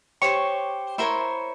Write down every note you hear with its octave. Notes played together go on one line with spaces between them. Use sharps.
G4 C5 C#5 C#6
E4 A#4 C5 C#5 C6